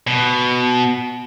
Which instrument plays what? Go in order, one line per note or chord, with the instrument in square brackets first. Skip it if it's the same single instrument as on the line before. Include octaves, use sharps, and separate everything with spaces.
[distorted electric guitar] B2